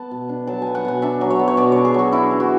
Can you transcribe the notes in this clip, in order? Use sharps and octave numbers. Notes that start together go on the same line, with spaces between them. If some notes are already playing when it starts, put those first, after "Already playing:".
Already playing: B3 A5
B2
D4
F#3 A5
B3 G#5
F#5
B2 G#5
D4 E5
F#3
C#5
B3
C#5
B2 D5
D4 C#5
G#4
F#3 F#4
D4 E4
E3
F#4